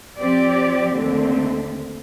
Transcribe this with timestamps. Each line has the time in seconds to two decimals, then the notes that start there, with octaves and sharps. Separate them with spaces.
0.18 F3 C4 G4 D5
0.94 D#2 D3 A3 C4